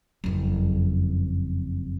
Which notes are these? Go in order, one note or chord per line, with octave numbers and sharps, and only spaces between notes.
F#1 F2